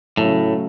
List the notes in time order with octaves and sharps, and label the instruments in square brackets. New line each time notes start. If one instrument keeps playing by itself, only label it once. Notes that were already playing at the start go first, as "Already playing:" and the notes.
[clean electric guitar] A2 [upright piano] C#3 F#3 A3